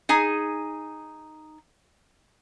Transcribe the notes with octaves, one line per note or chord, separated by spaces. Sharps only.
D#4 G#4 G#5